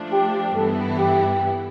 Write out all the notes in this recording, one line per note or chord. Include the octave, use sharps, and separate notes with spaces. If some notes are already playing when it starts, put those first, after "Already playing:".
Already playing: F3 A3 D4
G4
G2 E3 B3 E4 A4
G4